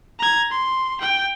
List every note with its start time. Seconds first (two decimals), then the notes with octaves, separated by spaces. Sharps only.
0.19 A#5 G#6
0.51 C6
1.01 G5